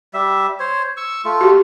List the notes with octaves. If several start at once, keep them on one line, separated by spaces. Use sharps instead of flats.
G3 E5
C5 C#5
C#6 E6
A3 F4
F#4 G4